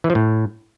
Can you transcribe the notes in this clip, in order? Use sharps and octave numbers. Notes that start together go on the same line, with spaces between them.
E3
F3
A2